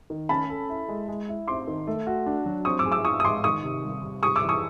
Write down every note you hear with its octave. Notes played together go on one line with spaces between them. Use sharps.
D#3
C#4 A5 B5
A4
E4
G#3
G#3
E4
C4 C6 D6
D#3
A3
F#4
D4
F#3
C4 C#6 D#6
D6 E6
G#4
D6 E6
F4 C#6 D#6
D#6
G#3 C6 D6
D#3 C#6 D#6
C3
G3
C3
G3 C#6 D#6
D6 E6
E3
C#6 D#6